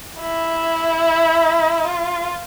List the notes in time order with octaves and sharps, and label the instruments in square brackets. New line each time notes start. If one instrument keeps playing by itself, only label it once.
[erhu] E4
F4